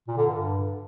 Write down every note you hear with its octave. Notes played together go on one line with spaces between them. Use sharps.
A#2
D3
G2